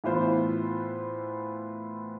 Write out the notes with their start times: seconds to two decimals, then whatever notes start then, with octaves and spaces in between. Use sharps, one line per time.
0.04 A2 E3 B3 F4 C5